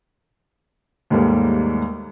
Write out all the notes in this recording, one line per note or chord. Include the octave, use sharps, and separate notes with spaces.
D#2 G#2 G3 A3 A#3